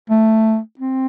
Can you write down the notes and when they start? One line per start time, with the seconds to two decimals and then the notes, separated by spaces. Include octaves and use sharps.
0.10 A3
0.79 C4